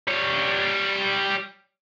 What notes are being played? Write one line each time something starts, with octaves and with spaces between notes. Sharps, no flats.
G3 C#5